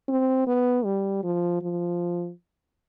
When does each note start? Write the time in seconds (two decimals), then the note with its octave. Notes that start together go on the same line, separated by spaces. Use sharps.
0.09 C4
0.47 B3
0.85 G3
1.23 F3
1.62 F3